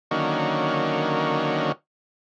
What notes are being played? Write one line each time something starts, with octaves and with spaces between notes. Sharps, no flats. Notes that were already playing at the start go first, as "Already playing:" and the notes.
D3 D#3 F#3 A#3 C#4